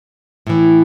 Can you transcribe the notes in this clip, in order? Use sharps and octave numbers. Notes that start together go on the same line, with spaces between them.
A2 E3